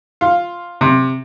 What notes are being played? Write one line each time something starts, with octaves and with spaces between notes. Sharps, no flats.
F4
C3